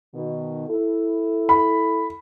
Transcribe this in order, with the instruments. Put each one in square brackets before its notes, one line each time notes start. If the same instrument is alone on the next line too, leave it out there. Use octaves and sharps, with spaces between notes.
[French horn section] B2 D#3
E4 A4
[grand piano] B5